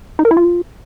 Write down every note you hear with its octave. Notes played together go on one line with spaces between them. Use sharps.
D#4
A#4
E4
F4